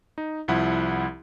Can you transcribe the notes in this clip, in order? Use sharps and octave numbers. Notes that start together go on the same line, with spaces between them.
D#4
C2 F3 E4 F#5 B5